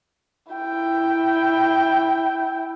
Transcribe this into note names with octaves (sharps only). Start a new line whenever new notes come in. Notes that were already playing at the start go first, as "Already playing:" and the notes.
E4 G5